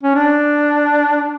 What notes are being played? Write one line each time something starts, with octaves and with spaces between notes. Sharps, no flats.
C#4
D4